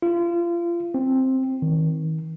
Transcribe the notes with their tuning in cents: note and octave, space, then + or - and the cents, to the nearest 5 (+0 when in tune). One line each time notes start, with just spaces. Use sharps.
F4 -30
C4 +5
D#3 +30